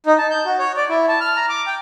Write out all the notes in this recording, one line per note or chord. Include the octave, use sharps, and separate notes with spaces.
D#4
A5
G6
F#4
C#5
D5
E4
A5
F6
A#5
D6
G5